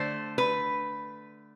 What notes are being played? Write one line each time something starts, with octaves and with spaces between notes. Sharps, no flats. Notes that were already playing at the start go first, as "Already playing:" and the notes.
Already playing: D3 A3 C5
B4